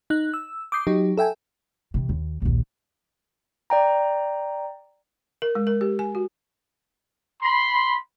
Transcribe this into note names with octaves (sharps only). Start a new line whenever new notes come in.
D#4 F#6
E6
D6 D#6 G6 C7
F#3 D#4 G4
A4 E5 G5 G#5
C3 E3
D#2
A#1 D#2
D5 G5 A#5
A#4
G#3
A#4
G4
G#5
F#4
B5 C6